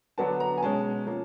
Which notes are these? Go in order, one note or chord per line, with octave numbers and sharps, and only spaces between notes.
D3 F#3 B3 D4 A5
A#5
G#5
B2 G#3 C#4 A5
F3 A#3 C#4